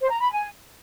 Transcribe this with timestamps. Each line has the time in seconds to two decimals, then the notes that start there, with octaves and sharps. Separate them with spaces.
0.01 C5
0.11 A#5
0.21 B5
0.32 G#5